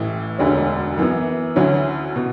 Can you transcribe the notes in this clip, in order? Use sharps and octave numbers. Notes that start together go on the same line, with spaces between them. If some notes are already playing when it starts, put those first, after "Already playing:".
Already playing: A1 A2 E3 A3
E1 D2 D3 G#3 C#4
F#2 E3 B3
D2 D3 F#3 C#4 E4
B2